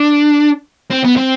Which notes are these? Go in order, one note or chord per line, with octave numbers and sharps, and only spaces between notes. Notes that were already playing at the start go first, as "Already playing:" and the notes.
Already playing: D4
C4
B3
C4